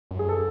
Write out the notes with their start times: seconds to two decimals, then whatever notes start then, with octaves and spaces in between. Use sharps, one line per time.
0.11 F#2
0.19 G#4
0.29 A4